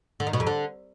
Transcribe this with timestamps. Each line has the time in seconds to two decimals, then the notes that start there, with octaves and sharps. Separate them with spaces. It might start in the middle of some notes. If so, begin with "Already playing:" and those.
0.20 D3
0.27 D#3
0.33 B2
0.40 F2
0.47 D3